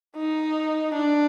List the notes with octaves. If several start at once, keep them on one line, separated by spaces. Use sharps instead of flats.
D#4
D4